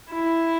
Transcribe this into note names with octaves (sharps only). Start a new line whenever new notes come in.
E4